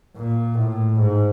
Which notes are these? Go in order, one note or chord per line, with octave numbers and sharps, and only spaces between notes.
A#2
A2
G#2